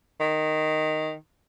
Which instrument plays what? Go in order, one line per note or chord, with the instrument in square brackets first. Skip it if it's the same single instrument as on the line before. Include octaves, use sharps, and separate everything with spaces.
[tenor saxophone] D#3